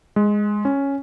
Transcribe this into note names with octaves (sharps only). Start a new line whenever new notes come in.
G#3
C#4